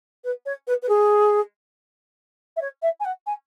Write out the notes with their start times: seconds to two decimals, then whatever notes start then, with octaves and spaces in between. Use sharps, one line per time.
0.24 B4
0.46 C#5
0.67 B4
0.82 B4
0.89 G#4
2.56 E5
2.61 C#5
2.82 E5
3.00 G#5
3.05 F#5
3.26 G#5